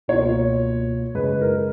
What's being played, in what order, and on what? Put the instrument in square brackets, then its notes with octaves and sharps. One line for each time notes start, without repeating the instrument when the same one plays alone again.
[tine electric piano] C#2 B2 A#3 F4 [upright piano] C#5
[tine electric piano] F#2 C#3 G#3 [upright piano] B4
[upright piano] A#4